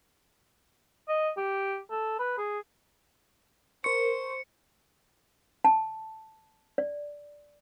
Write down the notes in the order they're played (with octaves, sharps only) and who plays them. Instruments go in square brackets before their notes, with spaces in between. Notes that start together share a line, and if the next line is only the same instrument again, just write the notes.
[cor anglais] D#5
G4
A4
B4
G#4
[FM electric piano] A#4 C6 C#6 [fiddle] C5 [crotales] C#7
[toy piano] A5
D5